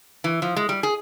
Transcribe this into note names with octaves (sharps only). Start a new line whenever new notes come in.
E3
F3
G#3
G3
G#4